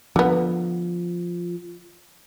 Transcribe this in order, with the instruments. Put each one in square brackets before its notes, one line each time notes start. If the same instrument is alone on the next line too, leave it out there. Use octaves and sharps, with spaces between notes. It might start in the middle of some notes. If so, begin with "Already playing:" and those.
[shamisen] D3 B3 [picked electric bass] F3